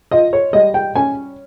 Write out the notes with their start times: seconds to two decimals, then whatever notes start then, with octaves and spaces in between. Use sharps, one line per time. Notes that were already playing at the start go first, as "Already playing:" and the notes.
0.11 F4 D#5
0.33 C#5
0.53 G3 D#5
0.74 G5
0.95 C#4 G#5